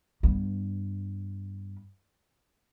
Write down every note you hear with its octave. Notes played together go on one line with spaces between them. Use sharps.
G2 B3